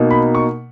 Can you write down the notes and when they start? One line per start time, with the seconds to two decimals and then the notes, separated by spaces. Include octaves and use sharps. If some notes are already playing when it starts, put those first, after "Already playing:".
Already playing: B2 A#3 D#4
0.11 B5
0.35 C#6